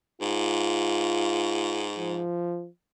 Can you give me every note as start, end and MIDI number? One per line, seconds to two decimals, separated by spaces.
0.21 2.21 44
0.21 1.88 65
1.98 2.68 53